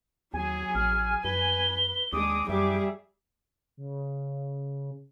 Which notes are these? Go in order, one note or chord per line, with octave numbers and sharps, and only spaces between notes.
D#2 F#3 G#4 G#5
A1 F6
F#2 B4 G7
D#2 G#3 D4 D6 D#6
F#2 G3 G#4 E5 D6
C#3